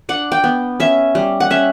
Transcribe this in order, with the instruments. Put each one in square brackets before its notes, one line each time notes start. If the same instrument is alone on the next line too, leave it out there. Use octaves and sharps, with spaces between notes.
[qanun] D4 F#5
G5
B3
C#4 E5
G3
F#5
C#4 E5